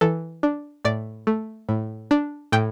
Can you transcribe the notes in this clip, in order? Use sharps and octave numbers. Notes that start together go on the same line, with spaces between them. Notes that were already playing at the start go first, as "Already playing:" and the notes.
E3 A4
D4
A2 D5
A3
A2
D4
A2 G5